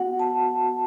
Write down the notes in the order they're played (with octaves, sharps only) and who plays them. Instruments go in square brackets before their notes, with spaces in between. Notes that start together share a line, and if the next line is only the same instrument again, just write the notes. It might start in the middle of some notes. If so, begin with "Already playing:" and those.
Already playing: [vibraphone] B3 F#4 F#5
A5